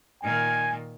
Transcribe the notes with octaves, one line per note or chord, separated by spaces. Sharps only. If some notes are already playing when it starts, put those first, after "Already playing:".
A#2 D#3 G#5